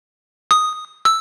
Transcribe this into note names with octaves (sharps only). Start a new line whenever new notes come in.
D#6
E6